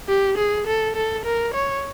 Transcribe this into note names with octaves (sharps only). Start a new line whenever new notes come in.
G4
G#4
A4
A4
A#4
C#5